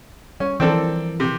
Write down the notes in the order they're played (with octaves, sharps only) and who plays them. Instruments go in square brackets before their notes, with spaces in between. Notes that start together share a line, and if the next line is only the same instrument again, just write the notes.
[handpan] G3 [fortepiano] C#4
[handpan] E3 F3 A#4 [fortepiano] C4 D4 A4
[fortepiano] C3